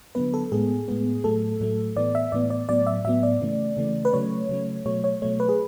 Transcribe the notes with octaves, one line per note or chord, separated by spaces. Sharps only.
D3 F#3 B3 B4
A4
A2 G#3 B3 G#4
A2 G#3 B3
A2 F#3 A3 A4
A2 F#3 A3
A2 E3 B3 D5
E5
A2 E3 B3 D5
D5
A2 F#3 B3 D5
E5
A2 F#3 B3 E5
D5
C#3 E3 A3
C#3 E3 A3
B4
C#3 F#3 A3 C#5
C#3 F#3 A3
B2 F#3 A3 C#5
C#5
B2 F#3 A3 C#5
B4
G#4